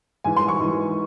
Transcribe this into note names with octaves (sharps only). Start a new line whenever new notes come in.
G#2 E3 G#5
C6
C#6
G#2 E3